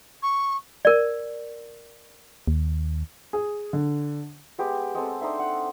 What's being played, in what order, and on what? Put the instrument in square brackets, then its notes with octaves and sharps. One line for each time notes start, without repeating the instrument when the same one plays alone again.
[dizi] C#6
[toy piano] A#4 D5
[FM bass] D#2
[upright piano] G#4
D3
[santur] G#3 B3 G4
G#3 C4 A4
D4 D#4 C5 E5
F#5